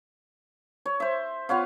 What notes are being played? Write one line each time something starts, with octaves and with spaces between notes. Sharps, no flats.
C#5
C5 E5
B3 F4 C#5 F5